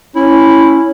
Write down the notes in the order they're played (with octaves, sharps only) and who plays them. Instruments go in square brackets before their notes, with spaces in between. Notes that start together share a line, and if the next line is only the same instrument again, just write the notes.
[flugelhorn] C#4 [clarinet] E4